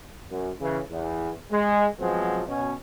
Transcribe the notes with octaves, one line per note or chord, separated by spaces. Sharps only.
F#2
C#3 E3
E2
G#3
F3 F#3 G#3 B3 C4
B2 C#4